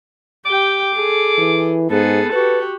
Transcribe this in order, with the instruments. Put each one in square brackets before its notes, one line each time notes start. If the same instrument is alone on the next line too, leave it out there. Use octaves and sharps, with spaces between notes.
[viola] G4 G5 [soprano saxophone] D6
[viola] G#4 A4
[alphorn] E3
[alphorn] G#2 [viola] B3 G#4 [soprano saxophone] A4
[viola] F#4 G4 [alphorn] B4